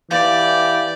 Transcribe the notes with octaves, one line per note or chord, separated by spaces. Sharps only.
E3 G4 D5 F5